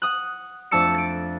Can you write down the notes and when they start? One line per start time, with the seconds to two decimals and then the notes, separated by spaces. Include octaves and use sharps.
0.02 F#5 D#6 F#6
0.71 F2 A3 D4 A5 E6 C#7
0.94 A6 D7